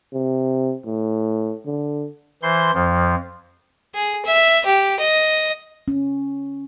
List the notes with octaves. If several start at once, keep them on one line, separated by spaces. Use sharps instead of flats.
C3
A2
D3
E3 C5 C6
F2 F3
G#4
E5
G4
D#5
C#4